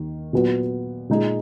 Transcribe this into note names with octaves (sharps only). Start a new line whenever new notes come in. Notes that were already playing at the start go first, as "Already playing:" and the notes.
Already playing: D#2 D#3
A#2 F#3 B3 F#4
A#2 G#3 D#4 G#4